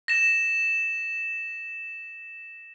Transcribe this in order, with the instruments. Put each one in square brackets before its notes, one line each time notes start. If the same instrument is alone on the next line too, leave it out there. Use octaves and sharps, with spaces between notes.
[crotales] A#6 E7